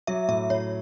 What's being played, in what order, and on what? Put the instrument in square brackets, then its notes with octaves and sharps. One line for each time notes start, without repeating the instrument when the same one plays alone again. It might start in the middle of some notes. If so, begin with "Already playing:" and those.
[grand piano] F#3 [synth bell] E5
[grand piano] A2 [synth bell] E5
[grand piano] A2 [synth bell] C#5